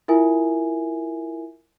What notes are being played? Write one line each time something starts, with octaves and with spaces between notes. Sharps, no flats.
E4 F4 A#4 E5 G#5